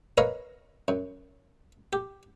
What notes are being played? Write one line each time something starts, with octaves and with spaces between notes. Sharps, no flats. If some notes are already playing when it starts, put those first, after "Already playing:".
A#4 B4 C#5 D#5 F5
F#2
G4